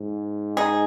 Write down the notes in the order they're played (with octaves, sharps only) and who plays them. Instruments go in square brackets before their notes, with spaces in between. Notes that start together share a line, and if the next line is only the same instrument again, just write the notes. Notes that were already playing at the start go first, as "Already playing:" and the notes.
Already playing: [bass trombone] G#2
[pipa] D#4 G#4